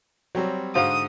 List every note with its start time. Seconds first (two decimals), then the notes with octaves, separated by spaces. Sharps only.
0.35 F#3 G3 C4 C#5
0.75 G#2 D3 F#4 C5 F5 D#6